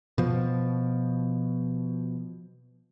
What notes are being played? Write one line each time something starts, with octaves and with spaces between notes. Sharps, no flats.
B2 F3